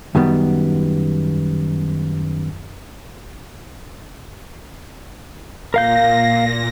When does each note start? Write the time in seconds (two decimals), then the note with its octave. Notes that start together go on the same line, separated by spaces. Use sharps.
0.15 F#2 D#3 G3 B3
5.74 A#2 A#4 F5 G6 A#6